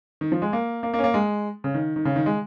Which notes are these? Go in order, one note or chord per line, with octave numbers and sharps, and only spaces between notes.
D#3
F3
G#3
A#3
A#3
A#3
C#4
A#3
G#3
C#3
D#3
D#3
C#3
D#3
G#3